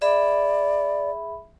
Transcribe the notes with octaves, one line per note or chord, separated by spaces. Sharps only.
G#4 D5 E5 B5